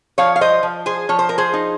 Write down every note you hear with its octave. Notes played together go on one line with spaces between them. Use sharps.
F3 C#5 F5
F5
C5 D#5
F3
G#4 C5
F3 C#5
C5
A#4
G#4 C5
D#4